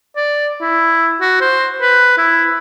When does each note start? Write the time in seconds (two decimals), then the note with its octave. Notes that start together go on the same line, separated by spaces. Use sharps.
0.16 D5
0.61 E4
1.21 F#4
1.41 C5
1.82 B4
2.18 E4